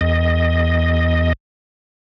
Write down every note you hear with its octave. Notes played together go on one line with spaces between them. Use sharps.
E2 D#5